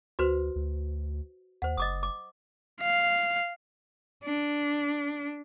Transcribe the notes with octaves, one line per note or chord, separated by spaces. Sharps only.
D2 F#4 B4 C5
D2
D#2 C5 F#5
F#1 D#5 D6 D#6
D6
F5
D4